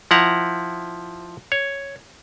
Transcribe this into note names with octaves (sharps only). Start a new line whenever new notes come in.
F3 E4 F#5 A#5
C#5